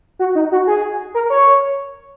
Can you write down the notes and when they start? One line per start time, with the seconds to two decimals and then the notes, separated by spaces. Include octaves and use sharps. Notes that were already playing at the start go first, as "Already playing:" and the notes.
0.19 F#4
0.35 D#4
0.52 F#4
0.67 G#4
1.15 A#4
1.30 C#5